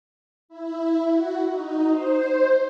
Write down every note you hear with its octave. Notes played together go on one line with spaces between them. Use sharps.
E4
F#4
D#4
C5